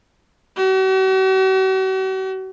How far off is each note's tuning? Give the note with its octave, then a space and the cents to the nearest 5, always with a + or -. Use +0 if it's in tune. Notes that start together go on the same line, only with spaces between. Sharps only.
F#4 +45